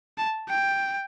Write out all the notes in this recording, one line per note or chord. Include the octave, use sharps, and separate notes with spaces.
A5
G5